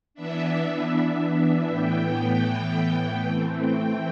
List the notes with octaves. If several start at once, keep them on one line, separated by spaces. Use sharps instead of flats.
E3 B3 D4 E5
A2 E3 B3 G5
E3 A3 C4
G5